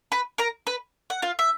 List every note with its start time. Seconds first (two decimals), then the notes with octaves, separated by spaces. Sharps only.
0.12 B4 B5
0.38 A#4 A#5
0.67 B4 B5
1.10 F#5
1.22 F4 F5
1.39 E5